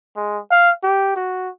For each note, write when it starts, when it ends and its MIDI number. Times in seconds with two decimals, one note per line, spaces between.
0.16 0.39 56
0.51 0.70 77
0.83 1.13 67
1.16 1.49 66